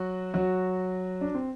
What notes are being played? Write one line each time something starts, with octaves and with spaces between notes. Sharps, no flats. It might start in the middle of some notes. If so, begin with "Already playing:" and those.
Already playing: F#3 F#4
F#3 F#4
D4
C4